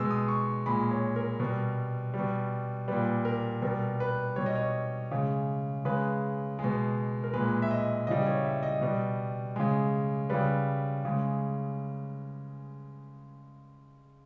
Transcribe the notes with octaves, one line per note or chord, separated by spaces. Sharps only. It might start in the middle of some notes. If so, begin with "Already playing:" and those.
Already playing: B2 G#3 E6
D#6
C#6
A#2 G#3 B5
C#5
A#4
B2 G3
G3
B2
A#2 G3 B4
A#4
B2 G3 A#4
B4
B2 G3 C#5
D#5
C#5
C#3 G#3
C#3 G#3 B4
G#3
B2
A#4
A#2 G#3 B4
E5
D#5
C#3 E3 G3 D#5
C#5
E5
D#5
B2 G3
C#3 G#3
C#3 G3 B4
C#3 G#3